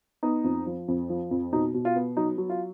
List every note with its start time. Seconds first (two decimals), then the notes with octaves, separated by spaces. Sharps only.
0.23 B3 D#4
0.44 F2
0.67 F3
0.88 F2
1.10 F3
1.31 F2
1.52 B2 D#4
1.74 B2
1.85 F4
1.96 B3
2.17 F#3 D#4
2.38 F#3
2.50 F4